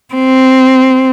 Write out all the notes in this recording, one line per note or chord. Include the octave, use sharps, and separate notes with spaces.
C4